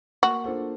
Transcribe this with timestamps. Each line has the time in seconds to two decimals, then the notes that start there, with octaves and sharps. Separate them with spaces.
0.23 A#3 F#4
0.44 D4 F4 A4 C5